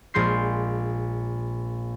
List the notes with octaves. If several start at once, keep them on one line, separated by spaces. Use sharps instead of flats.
A#1 A#2 G#3 C6 G6 C7